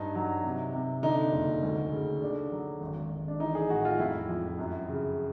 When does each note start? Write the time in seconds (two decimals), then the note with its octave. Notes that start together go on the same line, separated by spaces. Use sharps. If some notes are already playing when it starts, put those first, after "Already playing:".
Already playing: G2 D#4
0.15 F#3
0.44 C3
0.73 C3
1.03 D3 D#4
1.32 F#1
1.63 D2
1.92 C#3
2.22 D3 D4
2.52 F#3
2.81 G#1
3.10 G#1
3.28 D4
3.40 E3 D#4
3.55 G#4
3.70 A2 F#4
3.85 F4
3.99 F2 E4
4.29 F2
4.59 F#2
4.88 C#3